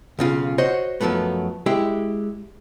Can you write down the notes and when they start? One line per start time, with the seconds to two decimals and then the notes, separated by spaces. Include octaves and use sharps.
0.19 B1 C#3 F4
0.58 F#4 C5 C#5 D#5 F#5
1.01 F#2 F3 F#3 A3 B3
1.66 G#3 E4 G4